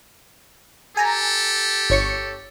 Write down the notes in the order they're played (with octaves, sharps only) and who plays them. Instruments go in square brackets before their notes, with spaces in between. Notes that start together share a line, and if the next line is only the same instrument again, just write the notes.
[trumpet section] G4 A4 [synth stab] G#5 A#5
[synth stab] G1 C#5 C#7